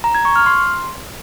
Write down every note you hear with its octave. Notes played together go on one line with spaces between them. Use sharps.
A#5
G#6
C#6
F6
C6